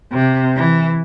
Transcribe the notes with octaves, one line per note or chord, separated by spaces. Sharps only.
C3
E3